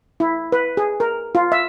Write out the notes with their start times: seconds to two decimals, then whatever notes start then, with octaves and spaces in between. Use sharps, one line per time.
0.20 E4
0.52 B4
0.77 G#4
1.00 A#4
1.35 F4
1.52 E5